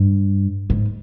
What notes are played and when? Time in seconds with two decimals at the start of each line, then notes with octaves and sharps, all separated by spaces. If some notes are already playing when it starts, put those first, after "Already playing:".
Already playing: G2
0.70 G#2